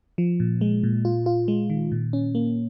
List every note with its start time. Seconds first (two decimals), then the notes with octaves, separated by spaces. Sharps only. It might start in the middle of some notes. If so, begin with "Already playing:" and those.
0.18 F3
0.40 A#2
0.61 G#3
0.84 A#2
1.05 F4
1.26 F4
1.48 G#3
1.70 D#3
1.92 A#2
2.13 C#4
2.35 A#3